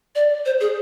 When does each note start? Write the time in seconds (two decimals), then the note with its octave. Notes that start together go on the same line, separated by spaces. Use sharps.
0.15 D5
0.46 C5
0.60 G#4